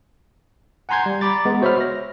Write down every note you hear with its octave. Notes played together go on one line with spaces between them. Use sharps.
F#5 G#5 A#5 C6 G6 G#6
G3
A#5 B5 D6 A6
G#3 B3
F#4 C5 C#5 E5 B5 F6
A#6